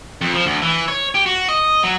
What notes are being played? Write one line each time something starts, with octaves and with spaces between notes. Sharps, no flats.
F2
F3
D2
E3
C#5
G4
F#4
D#5
F#3